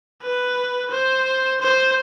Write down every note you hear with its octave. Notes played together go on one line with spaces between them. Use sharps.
B4
C5
C5